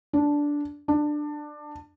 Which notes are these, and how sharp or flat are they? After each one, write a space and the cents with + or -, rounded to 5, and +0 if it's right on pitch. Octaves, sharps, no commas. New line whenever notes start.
D4 -10
D4 +15